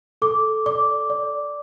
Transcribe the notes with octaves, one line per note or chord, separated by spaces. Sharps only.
A4 D6
D5 D6
D5